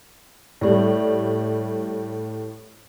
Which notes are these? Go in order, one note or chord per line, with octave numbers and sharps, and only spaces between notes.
A2 G3